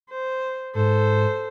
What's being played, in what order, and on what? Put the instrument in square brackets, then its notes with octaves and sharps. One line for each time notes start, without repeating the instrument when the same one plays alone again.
[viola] C5
[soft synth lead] G#2 [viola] A4 C5